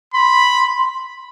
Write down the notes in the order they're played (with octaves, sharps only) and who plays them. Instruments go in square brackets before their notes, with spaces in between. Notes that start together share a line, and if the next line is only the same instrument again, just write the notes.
[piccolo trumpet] B5 [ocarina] C6